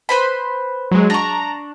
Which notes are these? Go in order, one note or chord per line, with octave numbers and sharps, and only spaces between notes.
B4 C5 B5
F#3 G#3
D4 A#5 C#6